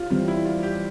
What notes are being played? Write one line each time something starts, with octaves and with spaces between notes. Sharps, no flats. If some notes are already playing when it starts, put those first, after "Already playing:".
Already playing: F4 G4
E3 G3 C4 F4
E4
F4
G4